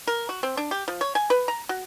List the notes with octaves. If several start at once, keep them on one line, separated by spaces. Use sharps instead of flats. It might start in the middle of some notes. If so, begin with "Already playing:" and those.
A#4
F#4
C4
D4
G4
F3
C#5
G#5
B4
A#5
F#4